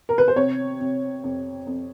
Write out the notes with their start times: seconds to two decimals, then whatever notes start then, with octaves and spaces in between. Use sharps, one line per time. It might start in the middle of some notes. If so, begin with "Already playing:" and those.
0.09 A#4
0.18 B4
0.28 C5
0.36 C3 C#5
0.80 C3
1.24 F2
1.67 F2